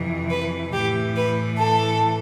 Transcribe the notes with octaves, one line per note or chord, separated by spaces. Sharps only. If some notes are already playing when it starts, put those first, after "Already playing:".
Already playing: F2 C3 E3
B4
A2 E3 G4
B4
A4